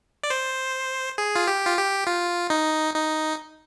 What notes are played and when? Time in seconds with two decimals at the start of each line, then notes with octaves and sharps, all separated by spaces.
0.23 D5
0.30 C5
1.18 G#4
1.36 F4
1.47 G4
1.65 F4
1.77 G4
2.07 F4
2.50 D#4
2.94 D#4